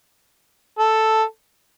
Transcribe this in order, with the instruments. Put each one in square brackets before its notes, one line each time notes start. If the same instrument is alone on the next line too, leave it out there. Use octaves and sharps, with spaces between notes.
[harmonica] A4